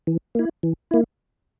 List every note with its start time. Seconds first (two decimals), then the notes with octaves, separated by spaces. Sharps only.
0.07 E3
0.35 A#3 E4
0.63 E3
0.91 A#3 E4